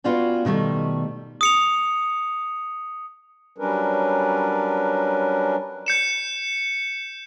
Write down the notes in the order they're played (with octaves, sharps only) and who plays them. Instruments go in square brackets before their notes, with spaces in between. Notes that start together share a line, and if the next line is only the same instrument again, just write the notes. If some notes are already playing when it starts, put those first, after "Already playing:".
[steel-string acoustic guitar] B3 C#4 F4 F#4 D5 G5
B2 D#3 G3 A3
[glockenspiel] D#6 C#7 F7
[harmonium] F#3 G3 C#4 D4 A#4 B4
[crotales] G6 C#7 E7